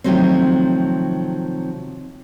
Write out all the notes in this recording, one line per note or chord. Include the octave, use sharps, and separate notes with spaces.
C3 D#3 F3 F#3 A3 C4